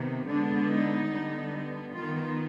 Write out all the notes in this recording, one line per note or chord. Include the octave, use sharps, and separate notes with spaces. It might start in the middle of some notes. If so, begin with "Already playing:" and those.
Already playing: C3 D#3 B3
D3 G#3 B3 D4
D#4
D3 G3 B3
D#3 B3 F4